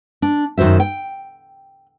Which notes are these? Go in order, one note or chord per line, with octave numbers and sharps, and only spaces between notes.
D4
F#2 D#3 F#4 C5 E5
G5